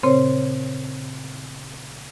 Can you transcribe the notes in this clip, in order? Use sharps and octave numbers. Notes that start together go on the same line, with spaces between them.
A#2 C#3 C4 C5 C#5